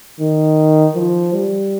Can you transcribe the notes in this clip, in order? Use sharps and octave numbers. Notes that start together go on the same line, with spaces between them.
D#3
F3
G3